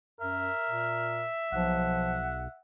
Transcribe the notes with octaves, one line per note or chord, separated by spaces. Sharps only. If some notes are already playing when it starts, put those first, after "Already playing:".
F#2 A#4 E5
A#2
B1 F3 F#5